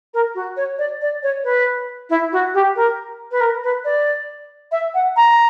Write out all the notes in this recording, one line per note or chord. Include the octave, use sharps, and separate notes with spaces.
A#4
F#4
C#5
D5
D5
C#5
B4
E4
F#4
G4
A#4
B4
A#4
B4
D5
E5
F#5
A#5